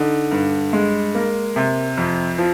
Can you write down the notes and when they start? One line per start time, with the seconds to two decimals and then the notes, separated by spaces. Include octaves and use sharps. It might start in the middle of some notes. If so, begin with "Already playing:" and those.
Already playing: D3 D#4
0.31 G2
0.73 G#3
1.15 A#3
1.56 C3
1.97 F2
2.38 F3